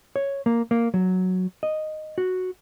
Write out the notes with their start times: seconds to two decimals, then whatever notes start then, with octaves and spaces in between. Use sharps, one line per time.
0.16 C#5
0.46 A#3
0.71 A#3
0.94 F#3
1.63 D#5
2.18 F#4